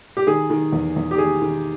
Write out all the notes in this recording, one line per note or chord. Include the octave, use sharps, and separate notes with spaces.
G4
D#3 G#4
D#3
E2
E2
G4
D#3 G#4
D#3